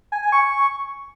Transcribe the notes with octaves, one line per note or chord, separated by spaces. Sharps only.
G#5
G#5
C#6